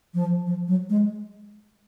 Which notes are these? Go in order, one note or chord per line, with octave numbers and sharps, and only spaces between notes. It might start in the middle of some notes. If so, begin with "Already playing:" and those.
F3
F3
F#3
G#3